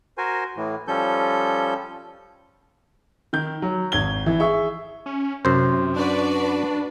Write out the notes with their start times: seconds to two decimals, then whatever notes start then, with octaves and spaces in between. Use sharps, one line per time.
0.18 F#4 A#4 C5 G#5
0.56 A2 E3
0.88 F3 G3 C#4 A4 G6
3.33 D#3 G6
3.62 F#3
3.92 G#1 G#6 G7
4.26 E3
4.40 G#4 E5 C#6
5.06 C#4
5.45 F#2 C3 C5
5.96 D4 F#4 B4 D5